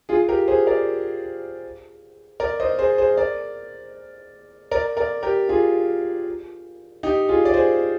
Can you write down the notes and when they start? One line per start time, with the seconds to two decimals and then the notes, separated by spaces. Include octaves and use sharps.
0.09 F4 G#4
0.29 G4 A#4
0.48 G#4 C5
0.67 A#4 D5
2.40 A#4 D5
2.60 C5 D#5
2.79 G#4 C5
2.98 G#4 C5
3.17 A#4 D5
4.71 A#4 D5
4.97 A#4 D5
5.23 G4 A#4
5.49 F4 G#4
7.03 D#4 G4
7.29 F4 G#4
7.45 D5
7.54 G#4 C5